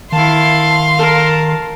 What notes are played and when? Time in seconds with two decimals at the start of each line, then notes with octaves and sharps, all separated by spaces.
0.12 D#3 E4 F5 A5 C6
0.99 A#4 A5